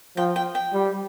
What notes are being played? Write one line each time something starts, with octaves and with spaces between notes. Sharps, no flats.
F3 G5
G5
G5
G3